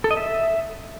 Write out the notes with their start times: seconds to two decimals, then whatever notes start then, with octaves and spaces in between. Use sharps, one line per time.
0.04 A4
0.11 D#5
0.17 E5